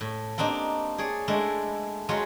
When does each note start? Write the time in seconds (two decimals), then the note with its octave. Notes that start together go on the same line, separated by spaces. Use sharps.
0.01 A2
0.38 A#3 C4 D4 D#4 G4
0.98 G#4 C#5 D5
1.28 G#3 A3 D4 E4
2.09 F#3 G#3 F4 C#5